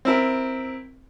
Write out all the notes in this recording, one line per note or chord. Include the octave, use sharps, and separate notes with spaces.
C4 E4 A#4